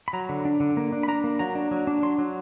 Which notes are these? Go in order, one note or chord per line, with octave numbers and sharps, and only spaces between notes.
B5
F#3 A#5
D3
D4
D3
A#3
D4
B5
D4 A#5
A#3
F#3 A#5
D4
F#3
D4
F#3 C6
F#3